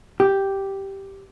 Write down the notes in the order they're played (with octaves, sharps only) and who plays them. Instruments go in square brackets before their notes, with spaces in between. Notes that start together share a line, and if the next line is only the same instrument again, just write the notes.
[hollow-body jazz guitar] G4